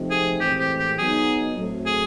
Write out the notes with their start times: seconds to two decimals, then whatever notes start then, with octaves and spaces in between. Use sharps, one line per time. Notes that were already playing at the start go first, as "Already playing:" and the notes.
Already playing: C3 F3 A3 C4 D#4
0.11 G#4
0.40 A2 E3 G#3 C4 G4
0.59 G4
0.79 G4
0.98 F#3 B3 D#4 G#4
1.57 A2 F#3 A3 C4
1.86 G#4